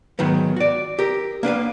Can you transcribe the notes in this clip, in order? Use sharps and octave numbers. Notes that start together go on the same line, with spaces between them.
G#2 D#3 F#3 B3
F#4 D5
G4 A#4
A#3 D4 B4 F5